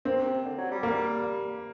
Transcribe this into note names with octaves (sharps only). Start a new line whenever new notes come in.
A#3 C4
C3
D3
F#3
G3
A#3